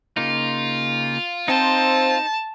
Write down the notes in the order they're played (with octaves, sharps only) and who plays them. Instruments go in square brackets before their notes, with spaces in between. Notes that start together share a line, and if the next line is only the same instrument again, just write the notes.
[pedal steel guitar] C#3 A#3 D#4 [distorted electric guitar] F4
[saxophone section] C4 [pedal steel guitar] D#4 C5 [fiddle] A5